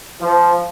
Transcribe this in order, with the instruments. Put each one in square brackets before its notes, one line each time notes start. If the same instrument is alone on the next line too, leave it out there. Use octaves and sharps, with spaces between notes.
[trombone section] F3